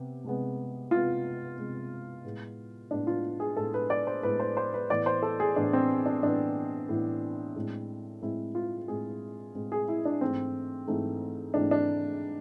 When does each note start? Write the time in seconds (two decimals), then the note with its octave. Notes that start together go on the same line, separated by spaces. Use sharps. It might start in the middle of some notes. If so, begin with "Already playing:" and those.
Already playing: C3 B3
0.24 C3 G#3 B3
0.91 C3 G#3 B3 F4
1.58 C3 G#3 B3
2.25 A2 G#3 B3
2.91 A2 G#3 B3 D4
3.07 F4
3.40 G#4
3.57 A2 G#3 B3 A4
3.74 B4
3.90 D5
4.07 C5
4.23 A2 G#3 B3 B4
4.39 C5
4.57 C5
4.74 B4
4.90 A2 E3 B3 D5
5.06 C5
5.23 A4
5.40 G#4
5.56 A2 E3 B3 D4
5.73 C4
6.06 D4
6.22 A2 E3 B3 D4
6.89 A2 E3 B3
7.56 A2 G#3 C4
8.22 A2 G#3 C4 E4
8.55 F4
8.88 A2 G#3 C4 G#4
9.55 A2 G#3 C4
9.72 G#4
9.88 E4
10.05 D4
10.21 G#2 E3 A3 C4
10.88 G#2 E3 A3 C4
11.54 G#2 E3 A3 C4 D4
11.71 D4